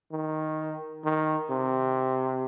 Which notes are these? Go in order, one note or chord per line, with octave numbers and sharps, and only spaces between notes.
D#3
D#3
C3